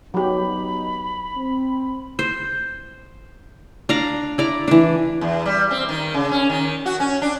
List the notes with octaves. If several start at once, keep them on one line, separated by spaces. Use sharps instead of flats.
F#3 B3 D#4 G4 B5
C4
C5
D4 D5 F5 A#5
E4 D5 A#5
E3 D4
E2
G3
C4
D#3
C#3
C#4
D#3
F#4
C#4
D4